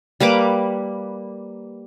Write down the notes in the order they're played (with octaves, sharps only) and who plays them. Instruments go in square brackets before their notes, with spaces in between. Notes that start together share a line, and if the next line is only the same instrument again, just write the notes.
[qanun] G3 A#3 B4 D6